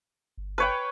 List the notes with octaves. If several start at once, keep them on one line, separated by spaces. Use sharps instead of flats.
G1
B4 C#5 G5